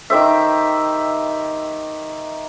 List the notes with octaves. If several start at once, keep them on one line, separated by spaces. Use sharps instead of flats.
D#3 G4 C5 E5